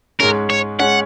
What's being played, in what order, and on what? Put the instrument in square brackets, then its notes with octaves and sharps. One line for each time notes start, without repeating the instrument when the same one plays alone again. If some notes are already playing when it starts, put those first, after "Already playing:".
[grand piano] G#2 G#3 C#4 [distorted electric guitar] A#4
[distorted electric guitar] C#5
[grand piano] G#3 C#4 [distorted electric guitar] F#5